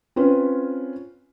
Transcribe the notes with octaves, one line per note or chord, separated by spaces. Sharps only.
C4 C#4 F4 B4